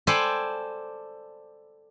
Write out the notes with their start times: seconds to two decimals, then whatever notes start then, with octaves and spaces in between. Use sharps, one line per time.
0.07 A4 C5 D5 G5 G#5 B5